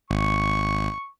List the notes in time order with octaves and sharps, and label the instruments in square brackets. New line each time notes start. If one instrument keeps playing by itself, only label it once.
[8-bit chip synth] G#1 [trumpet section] C#6